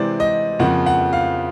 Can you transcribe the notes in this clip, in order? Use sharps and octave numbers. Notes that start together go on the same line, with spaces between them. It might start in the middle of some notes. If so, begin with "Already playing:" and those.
Already playing: C3 E3 G#3 C4 D5
D#5
F2 C#3 F3 A#3 F#5
F#5
F5